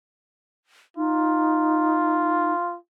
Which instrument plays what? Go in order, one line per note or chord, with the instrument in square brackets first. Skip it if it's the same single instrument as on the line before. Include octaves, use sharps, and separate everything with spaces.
[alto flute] D#4 [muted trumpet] F4